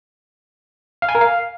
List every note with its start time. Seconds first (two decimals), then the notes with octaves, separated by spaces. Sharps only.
1.02 F5
1.09 G#5
1.15 A#4
1.21 F5